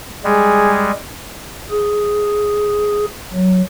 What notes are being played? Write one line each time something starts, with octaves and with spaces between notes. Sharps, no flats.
G3 G#3 G#4
G#4
F#3